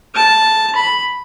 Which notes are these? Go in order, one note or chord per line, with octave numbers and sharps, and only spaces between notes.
A5
B5